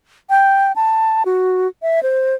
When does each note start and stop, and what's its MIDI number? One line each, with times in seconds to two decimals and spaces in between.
0.30 0.72 79
0.76 1.23 81
1.26 1.68 66
1.82 2.02 76
2.03 2.35 72